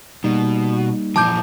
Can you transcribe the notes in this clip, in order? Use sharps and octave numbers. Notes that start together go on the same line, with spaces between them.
B2 G3 A#3 D#4
A#2 E3 F3 A5 D6 G6